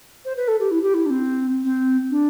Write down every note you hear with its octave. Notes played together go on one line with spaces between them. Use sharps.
C5
B4
A4
G4
E4
G4
E4
D4
C4
C4
D4